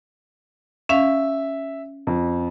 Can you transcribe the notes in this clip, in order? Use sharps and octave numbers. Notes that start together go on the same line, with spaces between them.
C#4 E5 F5
F2